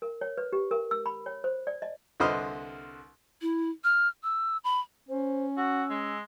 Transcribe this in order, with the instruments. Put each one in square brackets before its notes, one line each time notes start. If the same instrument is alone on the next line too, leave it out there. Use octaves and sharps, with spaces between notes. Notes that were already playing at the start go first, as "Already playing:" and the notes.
[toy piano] A#4
C#5
B4
G4
A#4
E6
B5
C#5
C5
D5
D#5
[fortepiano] C2 D3 B4 C5 D#5 F6
[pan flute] E4
F6
E6
B5
[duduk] C#4 [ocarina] C5
[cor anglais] F#4 [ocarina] E6
[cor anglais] G#3